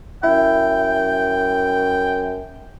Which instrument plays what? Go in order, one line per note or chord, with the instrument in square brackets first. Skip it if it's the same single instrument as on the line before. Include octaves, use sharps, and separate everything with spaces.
[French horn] F#2 [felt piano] E4 [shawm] G5